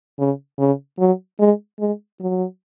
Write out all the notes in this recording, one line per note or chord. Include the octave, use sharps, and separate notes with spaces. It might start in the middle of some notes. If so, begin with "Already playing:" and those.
C#3
C#3
F#3
G#3
G#3
F#3